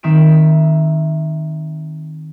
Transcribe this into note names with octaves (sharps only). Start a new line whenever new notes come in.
D#3 C4 E5 D7